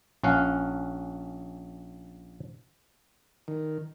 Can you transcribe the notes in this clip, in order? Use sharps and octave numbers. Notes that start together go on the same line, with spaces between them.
A#1 C#4 F5 F#5
D#3